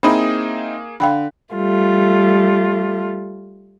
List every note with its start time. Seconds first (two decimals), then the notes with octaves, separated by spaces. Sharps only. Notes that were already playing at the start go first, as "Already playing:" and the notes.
0.03 A#3 C4 D#4 E4 G#4 B5 D#6
1.00 D3 F5 G5 B5
1.54 G3 A3 F4